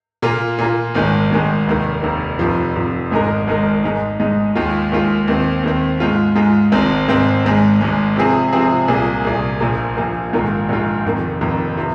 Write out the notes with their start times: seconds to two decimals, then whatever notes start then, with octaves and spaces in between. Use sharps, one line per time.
0.22 A#2 A#3 F4
0.59 A#2 A#3 F4
0.95 G#1 G#2 D#3 G#3
1.31 G#1 G#2 D#3 G#3
1.67 F1 D#2 D#3
2.03 F1 D#2 D#3
2.39 F1 F2 F3
2.75 F1 F2 F3
3.11 G#1 G#2 G#3 D#4 A#4
3.47 G#1 G#2 G#3 D#4 A#4
3.83 G#2 G#3 D#4
4.20 G#2 G#3 D#4
4.55 D#2 D#3 G#3 F4
4.92 D#2 D#3 G#3 F4
5.28 D#2 D#3 C4
5.64 D#2 D#3 C4
6.00 G#2 G#3 F4
6.36 G#2 G#3 F4
6.72 G#1 G#2 G#3 C4
7.08 G#1 G#2 G#3 C4
7.45 G#1 G#2 G#3
7.81 G#1 G#2 G#3
8.16 C3 F3 C4 G#4
8.53 C3 F3 C4 G#4
8.88 C2 A#2 A#3 G#4
9.24 C2 A#2 A#3 G#4
9.60 A#1 A#2 F3 A#3
9.97 A#1 A#2 F3 A#3
10.33 A#1 G#2 D#3 A#3 F4
10.69 A#1 G#2 D#3 A#3 F4
11.05 F1 F2 D#3 A#3
11.41 F1 F2 D#3 A#3
11.77 C3 F3